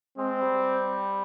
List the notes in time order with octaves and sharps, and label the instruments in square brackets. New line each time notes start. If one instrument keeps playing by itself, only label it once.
[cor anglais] G#3 [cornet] C4
[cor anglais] G3